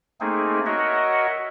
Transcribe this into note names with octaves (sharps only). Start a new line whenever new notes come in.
A3 A#3 C4 D#4 G#4
F#4 A#4 C#5 D#5 E5 F#5